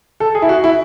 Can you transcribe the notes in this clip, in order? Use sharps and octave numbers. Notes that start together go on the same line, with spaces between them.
A4
G#4
E4
F#4
E4